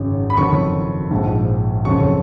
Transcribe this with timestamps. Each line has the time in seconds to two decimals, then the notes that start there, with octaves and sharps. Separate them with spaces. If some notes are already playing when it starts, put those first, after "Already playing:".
Already playing: G#1 F#2 C#3
0.30 B5
0.37 F#1 F2 D#3 F#3 C#6
1.10 A#1 G#2 F3
1.85 F#1 F2 C#3 F#3 C#6